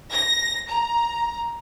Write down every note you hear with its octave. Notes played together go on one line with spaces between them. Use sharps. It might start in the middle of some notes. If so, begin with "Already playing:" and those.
A#6
A#5